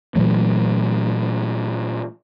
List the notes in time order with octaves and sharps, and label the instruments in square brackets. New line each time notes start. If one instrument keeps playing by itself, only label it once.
[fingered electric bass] A#2 E3 F#3 A3